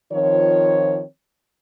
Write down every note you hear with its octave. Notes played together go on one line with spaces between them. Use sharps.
D#3 F3 C4 F4 C#5